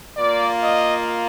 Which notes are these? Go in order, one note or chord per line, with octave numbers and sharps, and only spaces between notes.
A#3 F4 D5
D#5